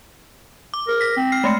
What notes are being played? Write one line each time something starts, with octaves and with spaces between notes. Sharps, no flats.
D6
A#4
A#6 B6
C4
F6 C7
G#3 A3 C#7